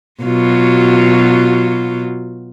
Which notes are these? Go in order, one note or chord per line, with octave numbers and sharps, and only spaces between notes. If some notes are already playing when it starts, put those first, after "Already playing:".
B2 F#3 F4